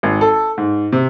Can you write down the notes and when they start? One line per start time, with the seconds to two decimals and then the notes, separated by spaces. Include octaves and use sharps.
0.03 G#1
0.21 A4
0.58 G#2
0.92 C3